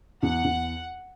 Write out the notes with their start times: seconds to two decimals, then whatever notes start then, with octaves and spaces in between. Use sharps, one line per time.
0.23 E2 F#5
0.44 E2